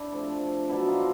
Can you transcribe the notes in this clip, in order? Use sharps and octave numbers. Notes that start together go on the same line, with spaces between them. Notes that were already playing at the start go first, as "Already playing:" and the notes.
Already playing: D4 E4
C3 F3 A3
B2 F#3 A3 D4 E4
D#4 F4